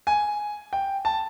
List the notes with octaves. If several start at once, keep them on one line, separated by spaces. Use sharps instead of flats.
G#5
G5
A5